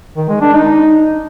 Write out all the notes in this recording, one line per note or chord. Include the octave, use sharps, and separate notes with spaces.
D#3
G#3
D4
D#4